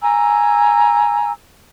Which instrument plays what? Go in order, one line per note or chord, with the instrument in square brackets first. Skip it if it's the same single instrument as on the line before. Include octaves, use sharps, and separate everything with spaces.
[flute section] G#5 A#5 E6